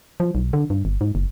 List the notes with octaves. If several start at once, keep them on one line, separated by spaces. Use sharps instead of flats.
F3
B1
D3
G2
G1
G#2
F#1